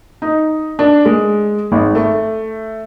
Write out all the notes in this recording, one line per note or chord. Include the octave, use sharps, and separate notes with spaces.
D#4
D4
G#3
G#1
A3